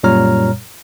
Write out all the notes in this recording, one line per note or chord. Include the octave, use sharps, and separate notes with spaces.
F#2 A#2 G3 C#5 A#5 F6